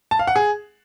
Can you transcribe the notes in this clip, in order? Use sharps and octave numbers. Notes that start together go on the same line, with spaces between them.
A5
F5
F#5
G#4